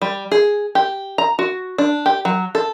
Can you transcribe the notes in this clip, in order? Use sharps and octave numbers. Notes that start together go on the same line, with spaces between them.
G3
G#4
G4
A#5
F#4
D4
G4
F#3
A4